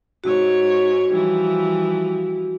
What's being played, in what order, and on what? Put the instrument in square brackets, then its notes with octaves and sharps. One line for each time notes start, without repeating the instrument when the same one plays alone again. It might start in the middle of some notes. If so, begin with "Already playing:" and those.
[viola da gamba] G#2 C#5 [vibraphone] F#4
[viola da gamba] E3 F3 G3